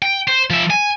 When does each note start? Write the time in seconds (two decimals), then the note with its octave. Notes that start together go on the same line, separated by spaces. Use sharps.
0.02 G5
0.28 C5
0.50 F3 E5
0.70 G#5